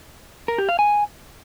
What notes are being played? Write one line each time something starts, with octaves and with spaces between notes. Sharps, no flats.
A#4
G4
F5
G#5